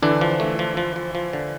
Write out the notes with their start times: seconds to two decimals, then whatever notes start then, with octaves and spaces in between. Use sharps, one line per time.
0.02 D3 E3 D4
0.21 F3
0.40 A3
0.59 F3
0.77 F3
0.96 F3
1.15 F3
1.33 D3